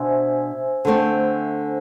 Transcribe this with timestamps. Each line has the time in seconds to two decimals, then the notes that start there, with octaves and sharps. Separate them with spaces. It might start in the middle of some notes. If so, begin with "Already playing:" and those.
Already playing: B2 D4 C5 E5 G#5
0.85 D3 A3 C4